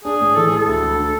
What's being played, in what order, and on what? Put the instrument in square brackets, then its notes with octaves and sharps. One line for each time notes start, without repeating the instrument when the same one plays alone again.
[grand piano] D4 [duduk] G#4
[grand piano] A2
[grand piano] E3 [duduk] A4
[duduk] G#4
[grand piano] G#3 [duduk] A4
[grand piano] D2
D2
D3